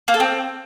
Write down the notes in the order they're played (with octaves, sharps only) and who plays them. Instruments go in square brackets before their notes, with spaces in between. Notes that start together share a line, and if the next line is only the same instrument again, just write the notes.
[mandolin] A#3
A4
C4